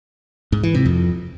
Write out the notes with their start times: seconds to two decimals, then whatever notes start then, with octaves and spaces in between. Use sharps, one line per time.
0.52 G#2
0.63 E3
0.74 C3
0.86 F2